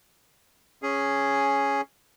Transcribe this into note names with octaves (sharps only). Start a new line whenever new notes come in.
C#4 G#4